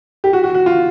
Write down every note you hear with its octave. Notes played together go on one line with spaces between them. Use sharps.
G4
F#4
F#4
F#4
F4